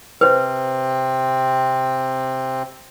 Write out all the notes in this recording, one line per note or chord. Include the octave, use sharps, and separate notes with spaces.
C3 C4 B4 C5